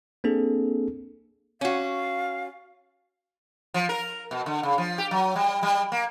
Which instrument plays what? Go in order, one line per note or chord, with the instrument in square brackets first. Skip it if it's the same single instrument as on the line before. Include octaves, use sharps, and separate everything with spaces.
[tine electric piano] A#3 C4 D4 G#4 A4
[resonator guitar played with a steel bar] C#4 F#4 [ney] F5
[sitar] F3
A#4
B2
D3
C#3
F3
G4
F#3
G3
G3
A#3